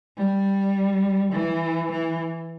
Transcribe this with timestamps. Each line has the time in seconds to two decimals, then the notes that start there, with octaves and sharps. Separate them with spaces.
0.18 G3
1.33 E3
1.91 E3